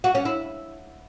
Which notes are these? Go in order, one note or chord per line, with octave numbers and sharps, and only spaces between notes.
F#4
C#4
E4